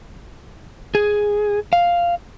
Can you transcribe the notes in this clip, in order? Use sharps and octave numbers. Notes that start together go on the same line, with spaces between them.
G#4
F5